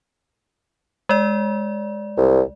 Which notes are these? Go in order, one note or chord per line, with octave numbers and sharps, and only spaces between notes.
G#3 D5
C2